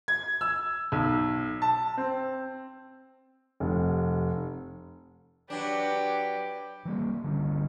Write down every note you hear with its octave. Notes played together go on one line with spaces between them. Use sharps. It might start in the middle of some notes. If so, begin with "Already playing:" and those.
G#6
E6
B1
A5
C4
F1
F#3 D4 G4 B4
E3 G3 A#3
D3 G3 A#3 C#4